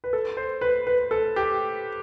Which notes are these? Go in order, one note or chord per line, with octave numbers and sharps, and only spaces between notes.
B4
A4
C5
B4
B4
A4
G4